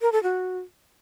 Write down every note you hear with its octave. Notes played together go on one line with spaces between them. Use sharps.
A#4
A4
F#4